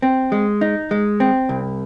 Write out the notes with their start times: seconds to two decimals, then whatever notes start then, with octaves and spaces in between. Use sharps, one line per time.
0.02 C4
0.32 G#3
0.61 D#4
0.91 G#3
1.20 C4
1.49 C2